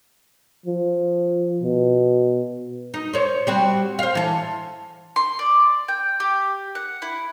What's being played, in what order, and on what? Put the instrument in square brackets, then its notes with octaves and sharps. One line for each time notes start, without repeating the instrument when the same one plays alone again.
[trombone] F3
B2
[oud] D#4
C5 C#5
G3 C4 F#4
C5 F5
E3 A4
[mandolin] C6
D5
G5
G4
F#5
E4